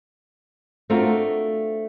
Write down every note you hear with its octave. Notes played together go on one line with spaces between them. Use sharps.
A3 C4 D4 F4 F#4 A#4